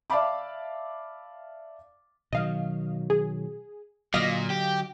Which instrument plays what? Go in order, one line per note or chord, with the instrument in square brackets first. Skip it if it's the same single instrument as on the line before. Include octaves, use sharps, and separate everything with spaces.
[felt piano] D5 E5 F5 A5 B5 D6
[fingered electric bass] B2 D#3 F#3 [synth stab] D#5 F5
[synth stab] G#4
[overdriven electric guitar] A#2 [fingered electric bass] D3 F#3 [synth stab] D#5 F5 A#6
[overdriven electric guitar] G4